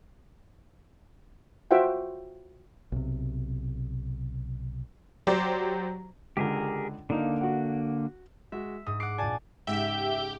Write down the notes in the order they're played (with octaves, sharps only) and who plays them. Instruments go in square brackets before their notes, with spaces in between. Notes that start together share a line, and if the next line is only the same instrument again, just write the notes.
[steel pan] F4 F#4 C5 E5 F#5 G5
[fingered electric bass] B1 C3
[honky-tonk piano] F#3 G4 C5 D5
[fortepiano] C#2 D3 [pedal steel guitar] G4 G#4 A#4
[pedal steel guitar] D3 A#3 [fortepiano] D4 D#4 F5
[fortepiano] F#4 F#5
[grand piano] G#3 F#4 [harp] E5
[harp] G#2 [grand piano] D#6
[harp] F#5 D6 [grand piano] C7
[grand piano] A#1 D5 [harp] G#5 A5
[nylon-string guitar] G#2 C#3 [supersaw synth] G4 [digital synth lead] E5 [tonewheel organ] G5